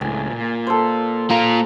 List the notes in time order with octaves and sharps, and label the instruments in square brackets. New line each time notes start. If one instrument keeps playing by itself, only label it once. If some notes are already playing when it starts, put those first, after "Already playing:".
[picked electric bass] C#2 A2 [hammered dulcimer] G#5
[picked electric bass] A#2
[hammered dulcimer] A4 C5
[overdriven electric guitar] A#3 F4 [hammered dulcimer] A#5